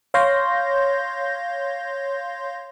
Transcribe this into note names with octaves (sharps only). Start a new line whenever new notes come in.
C#5 F5 C6 G6 A#6